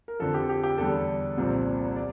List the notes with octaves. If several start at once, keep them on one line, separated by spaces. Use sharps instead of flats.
A#4
F2 D3 F3 A4
G4
G4
G4
E2 D3 G3 A4
C2 A#2 F3 C4
D5